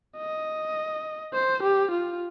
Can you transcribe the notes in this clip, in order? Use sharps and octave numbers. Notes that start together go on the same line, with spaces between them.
D#5
C5
G4
F4